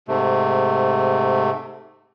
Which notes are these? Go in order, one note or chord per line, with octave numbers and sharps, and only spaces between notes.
G#2 C3 A3